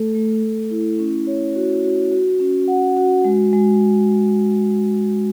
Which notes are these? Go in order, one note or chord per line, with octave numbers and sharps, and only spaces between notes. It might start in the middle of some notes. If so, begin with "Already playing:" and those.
Already playing: A3 A4
A3
A3
E4
C#4
C#5
F#4
F#4
F#4
C#4
F#5
F#4
G#3
G#3